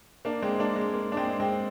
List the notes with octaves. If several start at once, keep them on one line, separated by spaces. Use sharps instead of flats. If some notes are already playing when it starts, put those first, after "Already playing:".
A#3 D4
G#3 C4
A#3 D4
G#3
A#3
D4
G#3 C4
G#3 C4